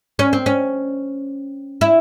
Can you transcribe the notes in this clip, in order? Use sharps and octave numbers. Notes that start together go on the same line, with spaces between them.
C#4
C4
C#4
E4